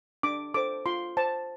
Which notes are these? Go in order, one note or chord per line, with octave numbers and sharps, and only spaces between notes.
D4 D6
A4 C5 D6
F4 C6
C5 A5